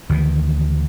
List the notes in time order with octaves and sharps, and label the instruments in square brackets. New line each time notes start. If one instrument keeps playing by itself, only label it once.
[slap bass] D2 D#3 E3